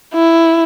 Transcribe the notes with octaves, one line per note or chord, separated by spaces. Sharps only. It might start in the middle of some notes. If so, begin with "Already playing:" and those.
E4